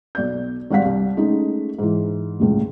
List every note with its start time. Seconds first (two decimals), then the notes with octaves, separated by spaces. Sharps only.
0.15 B1 D5 G6
0.70 G#1 G3 F5 F#5 B6
0.85 C2
1.17 G#3 A3 C#4 D#4
1.79 G#2 E3
2.40 F1 C#2 A2